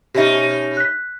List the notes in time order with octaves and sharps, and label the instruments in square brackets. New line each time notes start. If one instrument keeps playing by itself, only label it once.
[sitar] B2 C#4 D#4 [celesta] G4 E5
[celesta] F#6 B6